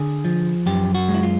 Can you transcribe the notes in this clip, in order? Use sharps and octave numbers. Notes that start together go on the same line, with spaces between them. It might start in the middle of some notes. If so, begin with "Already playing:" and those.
Already playing: D3 G#4
F3
F#2 G4
F#4
G#3
E4
F4